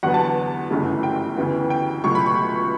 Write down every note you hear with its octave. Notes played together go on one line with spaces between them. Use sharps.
E2 D3 F#3 B3 F#5
A5
A5
G1 F#2 C#3 E3 A3
G5
D2 C#3 E3 B3
G5
C#2 B2 F#3 A3 C#6
B5
C#6